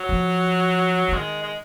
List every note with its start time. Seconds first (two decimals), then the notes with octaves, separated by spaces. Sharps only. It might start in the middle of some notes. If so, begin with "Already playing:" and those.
Already playing: F#3
0.09 F3
1.08 F3
1.13 D#3 G#3
1.43 G#3